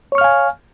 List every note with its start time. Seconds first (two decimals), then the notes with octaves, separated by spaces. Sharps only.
0.12 C#5
0.15 C#6
0.18 F6
0.21 F5
0.24 G#5